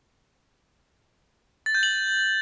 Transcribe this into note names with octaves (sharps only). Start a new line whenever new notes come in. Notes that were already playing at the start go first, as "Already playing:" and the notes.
A6
G6
F#7